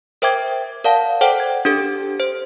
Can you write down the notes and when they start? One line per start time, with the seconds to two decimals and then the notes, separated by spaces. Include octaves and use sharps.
0.22 A#4 C5 E5 G5 D6 G#6
0.85 A#4 D5 F5 F#5 A5
1.21 A4 C5 D5 F#5 G5
1.40 G#6
1.65 D4 G4 A4
2.20 C5